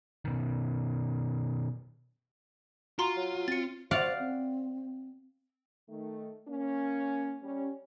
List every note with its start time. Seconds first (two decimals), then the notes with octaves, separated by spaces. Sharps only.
0.25 B2 D#3
2.99 F4 F#4 A#5 C6
3.17 F#3
3.48 C4 A6 C#7
3.91 C5 D5 F5 F#5
4.19 C4
5.89 D#3 A3
6.48 A#3 C#4
7.42 G3 C#4